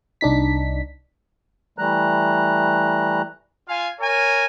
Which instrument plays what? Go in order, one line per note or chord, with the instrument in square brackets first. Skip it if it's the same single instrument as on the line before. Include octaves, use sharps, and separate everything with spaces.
[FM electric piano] C2 D4 D#4 B6
[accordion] E3 G3 A3 A#5 F#6
[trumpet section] F4 F5 G#5
A#4 C#5 G#5